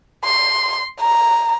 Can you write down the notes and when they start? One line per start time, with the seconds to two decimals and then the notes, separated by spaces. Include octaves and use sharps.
0.24 C6
1.00 A#5